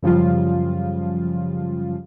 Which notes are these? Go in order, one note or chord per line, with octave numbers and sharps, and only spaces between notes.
F#2 C#3 F3 G3 F4